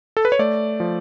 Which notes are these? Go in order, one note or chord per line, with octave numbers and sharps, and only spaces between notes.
A4
B4
C#5
A3 D5
F3